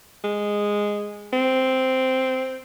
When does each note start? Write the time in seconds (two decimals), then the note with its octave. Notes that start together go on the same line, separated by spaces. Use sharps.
0.24 G#3
1.33 C4